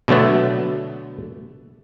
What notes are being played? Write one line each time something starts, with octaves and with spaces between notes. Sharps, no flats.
B2 D3 F#3 A3 B3